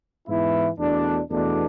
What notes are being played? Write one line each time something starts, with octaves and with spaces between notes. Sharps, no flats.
G#2 E3 B3 E4
E2 B2 A3 D4
E2 B2 A3 D4